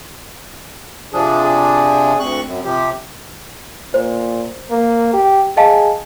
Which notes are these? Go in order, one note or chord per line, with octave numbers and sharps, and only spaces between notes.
C3 F3 D4 G#4
G#4
D2 C4 C#6 F#6
F#2
C3 F3 G4
A#2 C5
A#3
G4
G#4 D#5 F5 A5